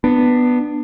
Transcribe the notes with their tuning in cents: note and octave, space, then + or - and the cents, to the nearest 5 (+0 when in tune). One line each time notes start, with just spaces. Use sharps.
B3 +0 D4 +20